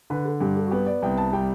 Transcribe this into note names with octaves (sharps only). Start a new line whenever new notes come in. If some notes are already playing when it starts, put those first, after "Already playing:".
D3 B4
A4
G2 G4
A4
F#4
B3 G4
D5
C2 G5
A5
G3 G5